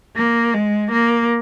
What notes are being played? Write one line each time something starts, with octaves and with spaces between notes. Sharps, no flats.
A#3
G#3
A#3